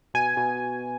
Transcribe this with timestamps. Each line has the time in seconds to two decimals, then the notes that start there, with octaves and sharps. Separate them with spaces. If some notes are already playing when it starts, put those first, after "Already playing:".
0.14 B2 G#5
0.37 B2